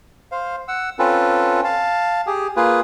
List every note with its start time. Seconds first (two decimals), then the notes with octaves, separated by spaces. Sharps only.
0.32 C5 F5
0.68 F#5 E6
0.99 C4 C#4 F4 A4 B4
1.64 F5 A5
2.27 G4 G#4
2.56 A#3 F4 G#4 B4